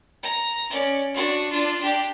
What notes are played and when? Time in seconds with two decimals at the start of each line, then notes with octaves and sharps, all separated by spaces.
0.23 A#5
0.70 C#4 D5
1.14 D4 F#4
1.51 D4 F4
1.81 D4 G4